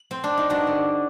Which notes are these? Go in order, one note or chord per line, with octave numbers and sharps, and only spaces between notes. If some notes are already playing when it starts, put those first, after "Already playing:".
Already playing: A#3
C4
D4
D#4
G2 D4 F#4
D3